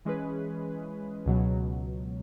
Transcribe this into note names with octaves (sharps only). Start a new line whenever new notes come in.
E3 G#3 C#4 G#4 B4
C#2 B2 F#3